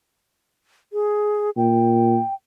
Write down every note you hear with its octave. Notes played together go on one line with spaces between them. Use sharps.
G#4
A#2 G5